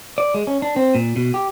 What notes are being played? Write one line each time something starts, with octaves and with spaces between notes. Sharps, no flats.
D5
G#3
C#4
D4
C4
A#2
B2
G4